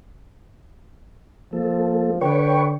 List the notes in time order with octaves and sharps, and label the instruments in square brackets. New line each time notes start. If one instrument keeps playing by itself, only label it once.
[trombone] F3 [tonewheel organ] A#3 A4
[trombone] D3 [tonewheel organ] B4 C#5 C#6 [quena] G5